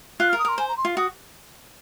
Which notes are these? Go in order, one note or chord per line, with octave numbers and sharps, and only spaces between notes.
F4 F#6
A#4 F6
D#6
A#4 C6
C5 G#5
A#5
C6
F4
F#4 D#6